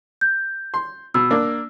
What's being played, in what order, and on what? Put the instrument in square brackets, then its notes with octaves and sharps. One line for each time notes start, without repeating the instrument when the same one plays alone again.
[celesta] G6
[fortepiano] C6
[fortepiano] B2 [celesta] E6
[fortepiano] A#3 D4